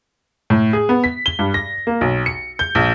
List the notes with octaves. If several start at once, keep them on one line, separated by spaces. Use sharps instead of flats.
A2
G#4
B3
B6
G7
G2
A#6
A#3
B1
C#7
G6
A#1